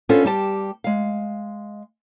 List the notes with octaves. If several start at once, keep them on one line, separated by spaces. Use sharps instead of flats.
B3 C#4 D4 F4 A4 C5
G3 G4 A5
G#3 F5